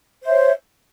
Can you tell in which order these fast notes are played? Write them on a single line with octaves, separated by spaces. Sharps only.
C5 E5 C#5